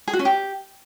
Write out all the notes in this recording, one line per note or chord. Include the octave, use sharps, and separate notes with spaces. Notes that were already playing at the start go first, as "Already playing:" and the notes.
G#4
F#4
C#4
G4